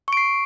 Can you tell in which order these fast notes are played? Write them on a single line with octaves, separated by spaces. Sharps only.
C#6 D7 C7